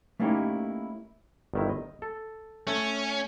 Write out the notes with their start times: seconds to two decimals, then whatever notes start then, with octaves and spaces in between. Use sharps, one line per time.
0.20 A3 A#3 C#4 D#4 E4 G4
1.54 G1 D#3 E4
1.69 D#5
2.02 A4
2.67 A3 C#4